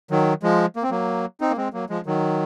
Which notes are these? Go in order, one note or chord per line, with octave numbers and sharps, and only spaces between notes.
D#3 F#3
F3 G#3
A#3
C4
F#3 A#3
C4 D#4
A#3
G#3 C4
F#3 A#3
F3 G#3
D#3 F#3